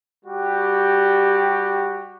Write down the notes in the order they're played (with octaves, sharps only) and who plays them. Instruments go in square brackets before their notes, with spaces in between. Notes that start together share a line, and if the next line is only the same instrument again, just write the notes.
[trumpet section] G3 F#4 G4